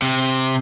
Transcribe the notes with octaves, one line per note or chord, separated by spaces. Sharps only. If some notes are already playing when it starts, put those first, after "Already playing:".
C3